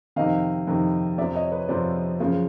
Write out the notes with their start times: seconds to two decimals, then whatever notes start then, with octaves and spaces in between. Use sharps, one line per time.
0.16 F2 C3 D#3 D#5 F5
0.67 F2 C3 D#3
1.18 F2 C3 F3 D5 E5
1.35 C#5 D#5
1.52 B4 C#5
1.69 F2 C3 F3 C5 D5
2.20 F#2 C#3 F3